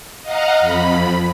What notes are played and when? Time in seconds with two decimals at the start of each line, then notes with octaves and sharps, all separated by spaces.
0.22 D#5 F5 F#5 A#5
0.60 F2 B5